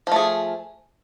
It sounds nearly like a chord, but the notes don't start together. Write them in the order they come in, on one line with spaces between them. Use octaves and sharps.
F3 A3 G#4